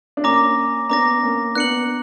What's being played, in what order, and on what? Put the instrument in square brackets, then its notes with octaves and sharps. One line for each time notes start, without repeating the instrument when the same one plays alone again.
[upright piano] D4
[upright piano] A#3 C#4 [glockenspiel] A#5 D6 A#6
[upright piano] B3 D4 [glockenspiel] A#5 D6 A#6
[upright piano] A#3 C#4
[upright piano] B3 D4 [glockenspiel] F#6 C#7 F#7